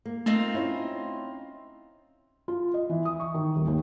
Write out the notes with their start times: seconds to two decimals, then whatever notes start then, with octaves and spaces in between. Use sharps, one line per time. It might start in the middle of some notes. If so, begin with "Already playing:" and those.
0.05 A#3
0.26 A3 C4 D#4 F4
0.54 C#4 E4
2.48 F4
2.74 D#5
2.90 E3
3.05 D#6
3.20 C#6
3.34 D#3
3.56 D#1
3.67 D#2